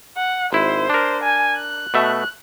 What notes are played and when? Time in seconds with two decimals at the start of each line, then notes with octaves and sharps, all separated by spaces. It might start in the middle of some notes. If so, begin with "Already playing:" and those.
0.17 F#5
0.53 G#1 E4 C5
0.90 D4 A#4
1.23 G#5
1.57 F#6
1.94 B2 A3 E5